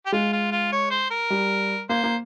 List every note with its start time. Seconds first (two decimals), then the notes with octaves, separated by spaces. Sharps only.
0.06 G4
0.12 G#3 F4
0.33 F4
0.51 F4
0.72 C#5
0.90 C5
1.11 A#4
1.30 G3
1.89 A#3 C5
2.04 A#3